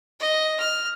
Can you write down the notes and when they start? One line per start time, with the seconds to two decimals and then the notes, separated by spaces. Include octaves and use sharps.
0.20 D#5
0.60 F6